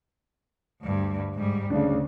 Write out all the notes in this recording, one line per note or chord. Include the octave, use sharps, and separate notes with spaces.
D2 G2
G#2 G3
D2 C#3 D4